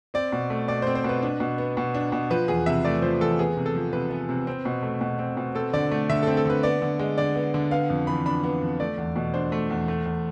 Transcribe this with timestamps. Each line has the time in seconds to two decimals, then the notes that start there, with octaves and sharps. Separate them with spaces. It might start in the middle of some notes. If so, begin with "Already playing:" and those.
0.14 C4 D5
0.32 B2
0.50 A3
0.68 B2 D5
0.82 C5
0.87 C4
0.95 C5
1.04 B2 B4
1.22 D4
1.40 B2
1.58 B3
1.77 B2
1.94 D4
2.12 B2
2.30 F3 B4
2.48 E2 G#4
2.66 C3 E5
2.84 A3 D5
3.02 F3 C5
3.21 E2 A4
3.39 B3 G#4
3.57 C3
3.66 A4
3.75 F3
3.93 C3 B4
4.11 B3
4.29 C3
4.47 C4
4.65 B2
4.83 A3
5.01 B2
5.19 C4
5.37 B2
5.55 C4 A4
5.73 D3 D5
5.91 A3
6.09 D3 E5
6.23 C4 A4
6.37 A4
6.45 D3 B4
6.63 B3 D5
6.82 D3
6.99 G#3
7.18 D3 D5
7.36 B3
7.54 D3
7.71 B3 F5
7.90 F2
8.07 E3 B5
8.26 D4 B5
8.44 B3
8.62 F2
8.80 A3 D5
8.98 E2
9.16 B2
9.34 D4 C5
9.52 A3
9.70 E2
9.88 A3
10.06 E2